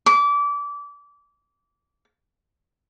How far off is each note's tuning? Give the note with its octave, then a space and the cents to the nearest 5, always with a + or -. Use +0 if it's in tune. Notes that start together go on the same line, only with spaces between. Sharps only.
D6 -25